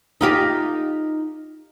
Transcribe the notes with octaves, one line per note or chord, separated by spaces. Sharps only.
D#4 F4 G4